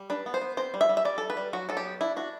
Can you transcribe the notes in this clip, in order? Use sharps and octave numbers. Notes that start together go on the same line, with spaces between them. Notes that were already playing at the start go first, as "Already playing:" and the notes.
Already playing: G3
D4 B4
B3
C5
B3
C4 C5
G3
E5
G3
E5
G3 D5
G3 A4
B4
G3
F#3 F#4
F#3 A4
G4
B3
D4 E4
D4 F#4